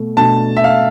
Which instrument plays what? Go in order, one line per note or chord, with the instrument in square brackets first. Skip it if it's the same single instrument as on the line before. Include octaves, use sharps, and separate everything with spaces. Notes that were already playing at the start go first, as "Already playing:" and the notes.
Already playing: [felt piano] B2 A3
[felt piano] B2 A3 D4 [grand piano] A5
[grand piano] E5
F5